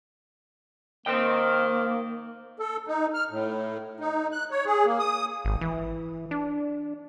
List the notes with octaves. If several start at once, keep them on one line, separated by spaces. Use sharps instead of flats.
D#3 A#3 C5 G5
A4
D#4
F6
A2
D#4
F#6
C#5
G#4
A#3
D#6
G#1
E3
D4